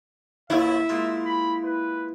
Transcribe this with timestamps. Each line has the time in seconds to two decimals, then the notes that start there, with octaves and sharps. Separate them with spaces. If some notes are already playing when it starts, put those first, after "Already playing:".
0.50 A1 D#2 E4 F4 E5
0.89 G#3 A#3 F4
1.25 B5
1.64 B4